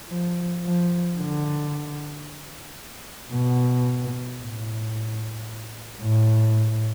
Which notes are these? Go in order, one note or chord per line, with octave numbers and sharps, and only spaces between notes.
F3
F3
D3
B2
A2
A2